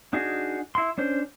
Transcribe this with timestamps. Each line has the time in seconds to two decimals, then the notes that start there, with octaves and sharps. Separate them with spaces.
0.13 D4 D#4 F#4 G#4
0.75 E4 C6
0.98 C#4 D4 C5